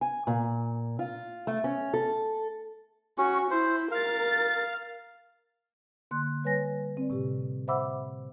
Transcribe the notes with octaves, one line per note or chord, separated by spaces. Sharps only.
G#5
A#2
F4
A3
C#4
A4
C#4 F#4 C#6
E4 C5
A#4 F5 A6
D3 A#3 C6 F#6
G3 B4 C#5 G#5 A#6
C4 D5
A2 C3 G4
C5 E5 F#5 B5 D6 E6